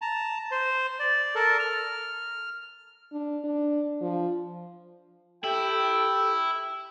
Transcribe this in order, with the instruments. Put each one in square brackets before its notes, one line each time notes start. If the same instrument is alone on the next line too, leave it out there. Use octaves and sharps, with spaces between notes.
[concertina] A5 A#5
C5
D5
A4 A#4
F6
[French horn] D4
D4
F3
[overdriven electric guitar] E4 [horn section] G4 A4 G5